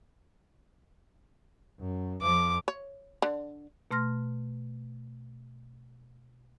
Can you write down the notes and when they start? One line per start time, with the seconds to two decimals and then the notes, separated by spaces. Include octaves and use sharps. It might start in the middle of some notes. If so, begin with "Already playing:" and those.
1.80 F#2
2.22 F2 F3 D6
2.68 C#5
3.22 D3
3.91 B2 A3 C6 F6 A#6